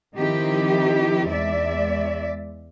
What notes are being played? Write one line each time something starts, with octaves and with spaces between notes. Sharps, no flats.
D#3 F3 C4 D#4 E4 G4
E2 G#3 D5 E5